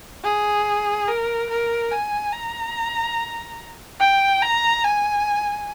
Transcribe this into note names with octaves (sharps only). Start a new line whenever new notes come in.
G#4
A#4
A#4
G#5
A#5
G5
A#5
G#5